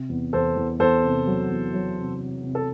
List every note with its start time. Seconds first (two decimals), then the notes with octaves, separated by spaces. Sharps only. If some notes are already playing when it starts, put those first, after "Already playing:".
Already playing: C3
0.09 E2
0.33 E2 A4 C5
0.57 E2
0.79 E2 A4 C5
1.03 C3
1.27 F#3
1.49 E2
1.74 F#3
1.97 C3
2.20 C3
2.43 C3
2.55 A4